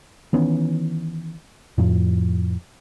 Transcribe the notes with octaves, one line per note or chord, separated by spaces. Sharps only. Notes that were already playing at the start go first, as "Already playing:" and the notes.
D#3 E3 B3 C#4
F2 A2 F3